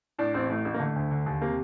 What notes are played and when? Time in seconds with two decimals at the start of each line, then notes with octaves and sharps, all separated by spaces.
0.18 A2 D4
0.34 A1 C4
0.50 A2 A3
0.65 A1
0.74 A#3
0.80 D3 A3
0.96 D2
1.11 D3
1.26 D#2
1.42 C3 A#3